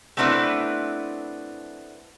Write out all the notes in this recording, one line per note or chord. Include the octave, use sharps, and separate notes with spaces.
A3 B3 C4 D4 E4 B4